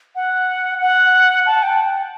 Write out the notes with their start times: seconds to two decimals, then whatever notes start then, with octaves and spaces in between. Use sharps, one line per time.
0.15 F#5
0.81 F#5
1.46 A5
1.63 G5